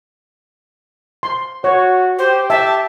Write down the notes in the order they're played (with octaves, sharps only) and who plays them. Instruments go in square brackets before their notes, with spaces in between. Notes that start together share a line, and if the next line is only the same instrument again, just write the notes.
[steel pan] C6
[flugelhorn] F#4 [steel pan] C#5
[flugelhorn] G4 [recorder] C5
[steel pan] E5 [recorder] A5